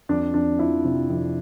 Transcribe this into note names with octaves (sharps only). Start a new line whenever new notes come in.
F2 D4
F2 D4
F3 E4
C3
F2